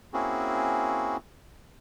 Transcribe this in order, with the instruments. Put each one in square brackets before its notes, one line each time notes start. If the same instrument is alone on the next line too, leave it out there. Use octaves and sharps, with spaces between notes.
[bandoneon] A#3 C4 C#4 E4 F#4 G#4